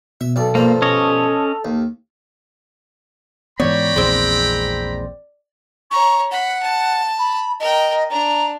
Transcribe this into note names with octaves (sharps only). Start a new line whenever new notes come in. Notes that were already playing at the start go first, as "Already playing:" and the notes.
B2 E5
B1 A4 D5
G2 F3 A#3
C#4 C#5 D#5
D#2
G#2 E3 B3 C#5 D5 G5 A#5 B5
A#1 E2 G#3 C4
C#5 A#5 C#6
F#5 B5
A5
B5
A#4 D#5 G5
D4 A#5